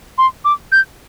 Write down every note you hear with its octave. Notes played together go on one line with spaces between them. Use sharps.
C6
D6
G6